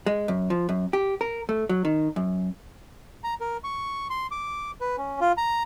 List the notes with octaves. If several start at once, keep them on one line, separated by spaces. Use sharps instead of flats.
G#3
F#2
F3
F#2
G4
A#4
A3
F#3
D#3
F#2
A#5
A#4
C#6
C6
D6
B4
C#4
F4
A#5